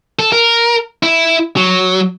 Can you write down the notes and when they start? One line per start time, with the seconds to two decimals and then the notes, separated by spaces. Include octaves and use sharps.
0.19 A4
0.32 A#4
1.03 E4
1.57 F#3